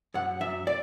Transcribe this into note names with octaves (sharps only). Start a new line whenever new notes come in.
F#2 F#5
F#2 E5
D5